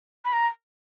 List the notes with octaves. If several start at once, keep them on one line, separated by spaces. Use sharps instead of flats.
B5
A#5